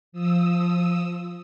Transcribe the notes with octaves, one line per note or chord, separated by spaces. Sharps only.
F3 D#6 E6